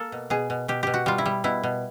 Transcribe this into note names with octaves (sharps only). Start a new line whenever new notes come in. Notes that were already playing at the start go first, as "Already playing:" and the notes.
Already playing: A#3 A4
B2
B2 G#4
B2
B2 G4
B2 G4
F#4
G3 F4
E4
G3
B2 E4
B2